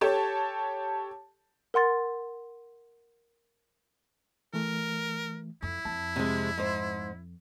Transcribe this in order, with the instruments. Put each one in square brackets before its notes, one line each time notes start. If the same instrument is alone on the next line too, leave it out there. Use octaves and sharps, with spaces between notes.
[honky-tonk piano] G4 A4 C#5 A5
[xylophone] A#4 F#5 C6 A6
[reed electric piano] E3 A3 [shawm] A#4
[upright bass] F2 [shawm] E4
[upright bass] F2 [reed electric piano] A5
[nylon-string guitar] C3 G#3
G#2 C5